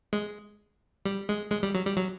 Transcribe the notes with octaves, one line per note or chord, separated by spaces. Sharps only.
G#3
G3
G#3
G#3
G3
F#3
G3
F#3